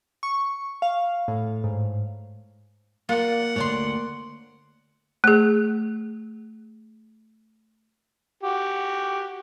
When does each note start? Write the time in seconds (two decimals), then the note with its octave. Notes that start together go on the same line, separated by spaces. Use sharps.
0.23 C#6
0.82 F5
1.28 A2
1.64 G#2
3.09 A#3 F4 D5 F#5
3.56 D2 G#2 C#5 D5 C6
5.24 A3 G#4
8.43 F#4 G4